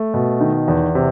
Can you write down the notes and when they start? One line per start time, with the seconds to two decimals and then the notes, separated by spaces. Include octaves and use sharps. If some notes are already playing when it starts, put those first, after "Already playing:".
Already playing: A3
0.14 B2
0.41 D#3
0.68 E2
0.95 C3